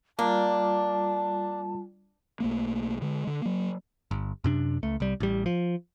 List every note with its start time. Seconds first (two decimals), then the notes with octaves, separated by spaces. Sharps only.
0.19 G3 A#3 D4 F4 A5
2.40 B1 A3 A#3
3.02 D3 G#3
3.27 D3
3.42 F#3 A#3
4.11 G1
4.44 F#2 C3 D4
4.83 C#2 A3
5.00 C2 G3
5.20 A1 G3
5.46 F3